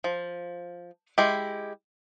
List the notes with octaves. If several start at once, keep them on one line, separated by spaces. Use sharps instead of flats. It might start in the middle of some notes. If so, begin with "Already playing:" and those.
F3
G#3 E4 G4